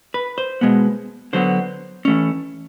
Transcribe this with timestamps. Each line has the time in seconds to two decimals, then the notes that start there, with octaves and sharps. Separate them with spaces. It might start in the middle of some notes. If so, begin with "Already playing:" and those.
0.14 B4
0.38 C5
0.61 B2 G#3 B3
1.33 D3 F#3 B3 C5
2.05 E3 A3 C#4